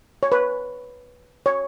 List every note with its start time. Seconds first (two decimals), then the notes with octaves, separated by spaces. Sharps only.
0.23 C#5
0.32 B4
1.46 C#5